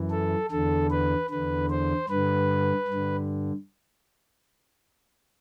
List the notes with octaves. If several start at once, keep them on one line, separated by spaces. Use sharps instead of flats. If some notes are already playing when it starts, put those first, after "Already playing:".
Already playing: F#2 E3
A4
E2 D3 A4
B4
E2 D3 B4
C5
G2 D3 B4
G2
D3